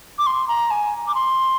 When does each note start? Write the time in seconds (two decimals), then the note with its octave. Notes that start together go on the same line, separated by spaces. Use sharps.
0.19 D6
0.27 C6
0.48 A#5
0.71 G#5
1.08 D6
1.15 C6